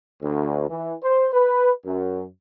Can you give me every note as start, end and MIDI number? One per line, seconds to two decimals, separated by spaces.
0.22 0.67 38
0.68 0.94 52
1.02 1.26 72
1.33 1.71 71
1.86 2.24 42